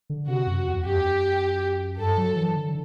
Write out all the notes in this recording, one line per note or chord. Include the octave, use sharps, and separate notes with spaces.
D3
C3 F#4
F#2
E2
F#2 G4
G2 A4
F#3
E3
D3